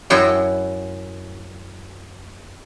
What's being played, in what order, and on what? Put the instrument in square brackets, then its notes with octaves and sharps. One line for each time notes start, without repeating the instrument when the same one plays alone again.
[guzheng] F#2 E4 F#4 G5